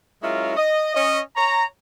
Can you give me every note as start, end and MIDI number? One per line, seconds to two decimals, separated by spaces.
0.23 0.54 54
0.23 0.54 56
0.23 0.54 61
0.23 0.54 64
0.23 0.54 65
0.23 0.54 70
0.57 0.93 75
0.95 1.20 61
0.95 1.20 75
1.36 1.65 73
1.36 1.65 82